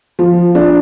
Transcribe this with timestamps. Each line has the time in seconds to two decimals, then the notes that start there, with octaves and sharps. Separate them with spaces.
0.19 F3
0.55 D4